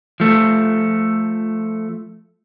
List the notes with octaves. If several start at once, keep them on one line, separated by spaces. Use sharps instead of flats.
F3 A3